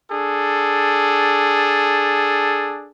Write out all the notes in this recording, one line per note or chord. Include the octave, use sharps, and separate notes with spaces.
D4 G#4 A4